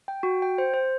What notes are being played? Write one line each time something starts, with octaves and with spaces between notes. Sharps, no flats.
G5
F#4
G5
C5
C5